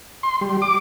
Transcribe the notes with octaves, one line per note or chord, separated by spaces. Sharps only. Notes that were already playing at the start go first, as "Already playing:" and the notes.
C6
G3
D6